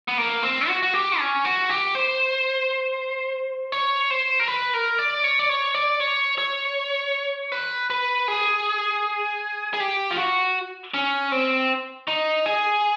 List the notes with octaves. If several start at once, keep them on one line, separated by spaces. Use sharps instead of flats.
B3
A#3
C4
F#4
F#4
G4
C#4
F#4
G4
C5
C#5
C5
A#4
B4
A#4
D5
C#5
D5
C#5
D5
C#5
C#5
B4
B4
G#4
G#4
G4
F4
F#4
C#4
C4
D#4
G#4